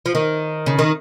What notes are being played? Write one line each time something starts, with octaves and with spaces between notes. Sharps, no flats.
F3
D#3
C#3
D#3